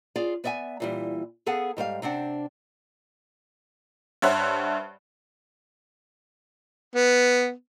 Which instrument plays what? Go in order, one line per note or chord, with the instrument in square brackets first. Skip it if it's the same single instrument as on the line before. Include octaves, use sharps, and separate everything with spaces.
[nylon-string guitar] F4 G#4 D5
B3 D5 E5 F#5 G#5
A#2 E3 G3
B3 G#4 A4 F5 F#5
G#2 G3 C5 F5
C3 C4 D4 F#5
[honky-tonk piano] G2 C5 C#5 E5 F#5
[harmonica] B3